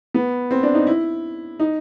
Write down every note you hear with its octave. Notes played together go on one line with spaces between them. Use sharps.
B3
C4
D4
D#4
E4
D#4